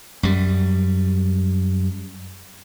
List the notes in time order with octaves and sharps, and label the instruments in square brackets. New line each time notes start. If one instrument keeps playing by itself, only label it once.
[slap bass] F#2 G3